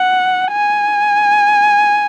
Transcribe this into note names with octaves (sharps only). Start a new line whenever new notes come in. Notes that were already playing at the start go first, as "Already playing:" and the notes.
Already playing: F#5
G#5